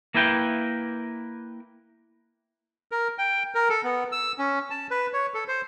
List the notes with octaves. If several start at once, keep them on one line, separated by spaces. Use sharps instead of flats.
A#3 E4 A#4 B4 G5
A#4
G5
A#4
A4
B3
E6
C#4
A5
B4
C#5
A4
C5